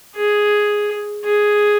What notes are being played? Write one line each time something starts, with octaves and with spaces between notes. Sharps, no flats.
G#4
G#4